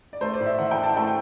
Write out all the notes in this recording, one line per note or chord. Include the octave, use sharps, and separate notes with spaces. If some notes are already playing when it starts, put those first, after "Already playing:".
D5
A3 C5
D5
A2
E5
E3 F#5
G5
E4
A5
A3 G5